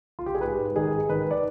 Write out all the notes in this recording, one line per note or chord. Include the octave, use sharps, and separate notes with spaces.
F4
G4
G#4
G#2 B4
G#2
D#3 G#4
G#2
D#3 B4
D5